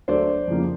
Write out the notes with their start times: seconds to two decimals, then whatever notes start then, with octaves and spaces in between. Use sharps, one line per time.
0.08 D2 D3 F#3 A3 C5 D5
0.48 F2 C#3 F3 A#3